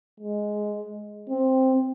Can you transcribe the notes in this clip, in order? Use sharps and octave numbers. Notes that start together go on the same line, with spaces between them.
G#3
C4